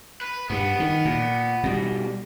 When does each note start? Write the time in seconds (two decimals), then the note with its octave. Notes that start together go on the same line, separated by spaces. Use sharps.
0.21 B4
0.50 G2 B3
0.80 D#3
1.05 A#2
1.64 B2 G3